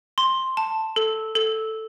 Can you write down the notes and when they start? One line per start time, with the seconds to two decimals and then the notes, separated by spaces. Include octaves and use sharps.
0.18 C6
0.57 A5
0.96 A4
1.35 A4